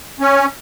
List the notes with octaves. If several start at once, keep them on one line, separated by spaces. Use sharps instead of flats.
C#4